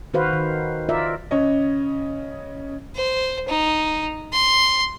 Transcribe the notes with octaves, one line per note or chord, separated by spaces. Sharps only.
D#3 F#4 B4 C5 F5
D#3
F4 A#4 D5 E5
C#3 C#5 D#5
C5
D#4
C6